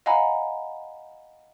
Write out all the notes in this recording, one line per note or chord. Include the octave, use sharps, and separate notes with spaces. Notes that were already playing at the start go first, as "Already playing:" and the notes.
D#5 F5 F#5 G#5 A#5 B5